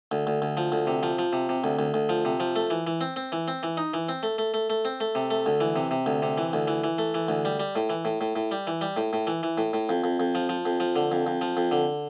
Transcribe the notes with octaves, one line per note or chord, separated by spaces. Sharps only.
D2
D2
D2
F3
D2
C3
F3
F3
C3
C3
D2
D2
D2
F3
C3
F3
A3
E3
E3
C4
C4
E3
C4
E3
D#4
E3
C4
A3
A3
A3
A3
C4
A3
C3
A3
D2
E3
C3
C3
D2
C3
E3
D2
E3
E3
A3
E3
D2
G3
G3
A2
E3
A2
A2
A2
G3
E3
G3
A2
A2
E3
E3
A2
A2
F2
F2
F2
F3
F3
F2
F3
D3
F2
F2
F3
F2
D3